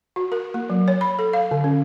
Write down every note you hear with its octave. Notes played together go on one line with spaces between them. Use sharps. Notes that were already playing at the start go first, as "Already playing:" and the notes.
F#4
A#4
A#3
F#3
C#5
B5
A4
F5
D3
C#4